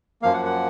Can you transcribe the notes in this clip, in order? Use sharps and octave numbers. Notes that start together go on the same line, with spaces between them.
F#2 F3 A#3 F5
F#5
F#5